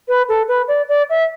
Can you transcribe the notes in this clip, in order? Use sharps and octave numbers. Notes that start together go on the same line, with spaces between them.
B4
A4
B4
D5
D5
E5